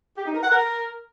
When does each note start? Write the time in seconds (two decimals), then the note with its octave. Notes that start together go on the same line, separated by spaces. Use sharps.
0.17 G4
0.26 D#4
0.34 A#4
0.43 F#5
0.51 A#4